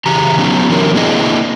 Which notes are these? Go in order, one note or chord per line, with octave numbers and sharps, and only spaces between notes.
C#3 E3 G4 A#5
F#3 B3 C#4 D#4 G4
D3 E3 F#3 A4 A#4
A#3 C4 D4 E4 G#4 D#5